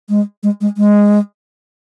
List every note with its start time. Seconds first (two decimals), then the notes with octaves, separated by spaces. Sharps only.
0.09 G#3
0.43 G#3
0.61 G#3
0.77 G#3